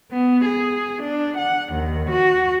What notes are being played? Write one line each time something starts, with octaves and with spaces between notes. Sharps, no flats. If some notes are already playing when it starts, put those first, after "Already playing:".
B3
G#4
D4
F#5
D#2
F#4